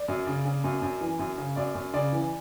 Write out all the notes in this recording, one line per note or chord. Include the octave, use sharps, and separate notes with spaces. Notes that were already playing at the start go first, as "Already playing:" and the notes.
Already playing: D5
F#2
C#3
C#3
F#2
F#2
E3
F#2
C#3
F#2 D5
F#2
C#3 D5
E3